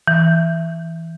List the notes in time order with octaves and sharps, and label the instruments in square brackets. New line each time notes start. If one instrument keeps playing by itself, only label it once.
[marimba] E3